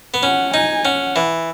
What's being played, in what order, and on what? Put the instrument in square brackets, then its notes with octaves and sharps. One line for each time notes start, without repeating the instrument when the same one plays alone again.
[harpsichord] B3
[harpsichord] C#4 [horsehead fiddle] F#5
[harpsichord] D#4 [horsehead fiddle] G#5
[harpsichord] C#4 [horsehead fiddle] F#5
[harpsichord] E3